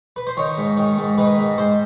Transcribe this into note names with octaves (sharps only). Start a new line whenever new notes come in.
B4
C5
D#3 C#5
G#2
D#3
G#2
D#3 B4
G#2
G#2 C5